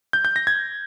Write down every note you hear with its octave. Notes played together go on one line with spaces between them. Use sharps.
G6
G6
A#6
G#6